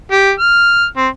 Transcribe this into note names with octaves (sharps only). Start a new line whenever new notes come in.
G4
F6
C4